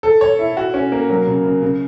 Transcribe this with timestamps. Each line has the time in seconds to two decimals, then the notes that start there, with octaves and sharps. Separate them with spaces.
0.03 A4
0.21 C#5
0.39 E4
0.57 F#4
0.74 C#4
0.92 A#3
1.10 F#3
1.27 C#3
1.44 C#3
1.62 C#3